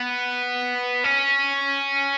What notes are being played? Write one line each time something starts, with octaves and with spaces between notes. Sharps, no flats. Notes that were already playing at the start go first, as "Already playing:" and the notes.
Already playing: B3
C#4